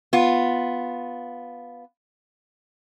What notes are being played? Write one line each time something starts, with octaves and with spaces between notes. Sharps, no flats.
B3 F4